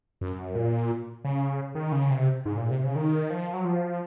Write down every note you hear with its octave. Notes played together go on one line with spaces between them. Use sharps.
F#2
A#2
C#3
D#3
C#3
C3
G#2
A#2
C3
C#3
D#3
F3
F#3
F3